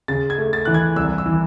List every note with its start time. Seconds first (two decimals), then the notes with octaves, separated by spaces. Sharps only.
0.08 C#3 A6
0.30 G#6
0.38 A3
0.53 A6
0.65 E3 F#6
0.74 G#6
0.96 C2 E6
1.18 E6
1.26 E3